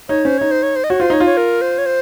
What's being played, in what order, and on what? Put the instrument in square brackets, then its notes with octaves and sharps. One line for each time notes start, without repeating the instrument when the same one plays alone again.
[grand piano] D#4 [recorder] C#5
[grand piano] C#4 [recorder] C5
[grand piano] D#4 [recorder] C#5
[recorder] C5
C#5
C5
D#5
[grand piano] F#4 [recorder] C#5
[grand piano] F4 [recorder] C5
[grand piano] D#4 [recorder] C#5
[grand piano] F4
[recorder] C#5
A#4
C5
C#5
C5